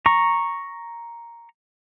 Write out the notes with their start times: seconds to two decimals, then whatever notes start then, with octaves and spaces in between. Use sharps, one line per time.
0.06 A#5 C#6